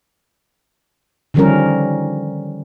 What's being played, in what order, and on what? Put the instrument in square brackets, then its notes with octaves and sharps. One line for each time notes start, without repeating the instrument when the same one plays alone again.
[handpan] D3 D#3 F3 G3 C#4 A#4